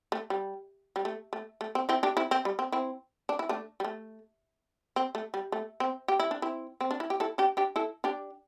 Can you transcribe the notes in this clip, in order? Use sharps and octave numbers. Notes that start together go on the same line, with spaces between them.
A3
G3
G3
A3
A3
A3
C4
C4 E4
D4 G4
C4 E4
C4
G3
C4
C4 E4
D4
E4
A3 D4
G3
A3
C4
A3
G3
A3
C4
G4
E4
D4
C4 E4
C4
D4
E4
G4
E4 A4
D4 G4
D4 G4
E4 A4
D4 G4